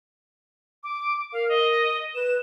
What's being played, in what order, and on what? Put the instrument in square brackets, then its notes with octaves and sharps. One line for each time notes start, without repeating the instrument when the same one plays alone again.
[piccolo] D6
[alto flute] A#4 [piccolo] F5
[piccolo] D#5
[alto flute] B4 [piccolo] E7